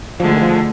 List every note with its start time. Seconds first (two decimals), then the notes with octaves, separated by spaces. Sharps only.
0.20 D2 D3 F3 G#3
0.36 D#3
0.41 F3